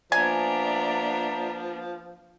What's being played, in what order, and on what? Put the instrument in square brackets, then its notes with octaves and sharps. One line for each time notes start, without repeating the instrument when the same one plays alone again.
[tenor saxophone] F3 [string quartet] A#3 B3 D4 [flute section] D5 E5 A#5 [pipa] G#5